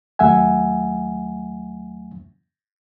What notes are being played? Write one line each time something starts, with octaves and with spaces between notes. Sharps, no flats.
D#2 F#3 A3 E5 F#5 G#5